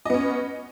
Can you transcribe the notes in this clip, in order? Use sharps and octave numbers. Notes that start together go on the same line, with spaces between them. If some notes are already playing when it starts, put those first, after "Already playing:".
B3 C#4 D#5